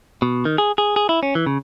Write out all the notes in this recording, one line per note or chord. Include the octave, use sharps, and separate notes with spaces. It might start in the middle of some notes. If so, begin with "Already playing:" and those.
B2
D#3
G#4
G#4
G#4
E4
C#4
E3
C#3